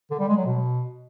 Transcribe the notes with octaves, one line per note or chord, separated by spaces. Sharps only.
D3
G3
G#3
F#3
B2